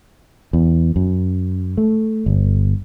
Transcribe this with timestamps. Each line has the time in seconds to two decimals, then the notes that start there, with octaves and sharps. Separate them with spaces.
0.53 E2
0.96 F#2
1.77 A3
2.26 G1